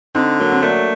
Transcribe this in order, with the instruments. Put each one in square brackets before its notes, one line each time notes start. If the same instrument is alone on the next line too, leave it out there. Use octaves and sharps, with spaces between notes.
[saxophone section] D3 [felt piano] C4 D#4
[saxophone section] F#3 [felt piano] A#3
[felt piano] C4
[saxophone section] A3 [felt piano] A#3 D4